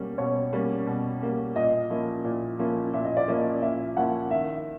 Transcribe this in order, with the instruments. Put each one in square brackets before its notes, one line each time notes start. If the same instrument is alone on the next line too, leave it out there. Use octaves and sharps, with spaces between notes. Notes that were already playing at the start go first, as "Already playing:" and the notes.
Already playing: [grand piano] B2 G3 A#3 C#4
[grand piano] B2 [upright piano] C#5
[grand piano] G3 A#3 C#4
B2
G3 A#3 C#4
[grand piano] A#2 [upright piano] D#5
[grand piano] F3 A#3 C#4 E4
A#2
F3 A#3 C#4 E4
[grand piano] A#2 [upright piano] E5
[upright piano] D#5
D5
[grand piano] F3 A#3 C#4 E4 [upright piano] D#5
[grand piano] A#2 [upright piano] E5
[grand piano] F3 A#3 C#4 E4 [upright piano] F#5
[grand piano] D#3 [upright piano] E5